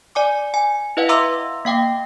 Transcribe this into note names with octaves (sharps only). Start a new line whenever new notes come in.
D5 G#5 D6
G#5
E4 B4 D#5 F5 F#5
E5 F5 A#5 C6 D6 E6
A#3 F5 G5 D6